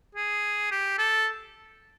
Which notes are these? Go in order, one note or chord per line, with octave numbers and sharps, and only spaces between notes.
G#4
G4
A4